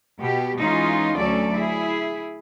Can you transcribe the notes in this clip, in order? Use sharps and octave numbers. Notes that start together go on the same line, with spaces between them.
B2 G4
E3 G#3 C#4 D#4 F4
D2 F#3 C#4 A4 D5
E4 G#4